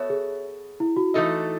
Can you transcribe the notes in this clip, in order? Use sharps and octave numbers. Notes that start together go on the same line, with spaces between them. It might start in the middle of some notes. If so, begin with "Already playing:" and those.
Already playing: B3 F#4 A4 C#5 E5
G#4
E4
F#4
E3 A3 D#4 A4 D#5